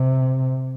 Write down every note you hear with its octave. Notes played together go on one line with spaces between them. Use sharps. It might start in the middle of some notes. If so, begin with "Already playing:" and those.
Already playing: C3